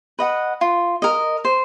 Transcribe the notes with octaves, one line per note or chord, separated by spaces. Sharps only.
B4 D#5 F#5
F4
A#4 D#5
C5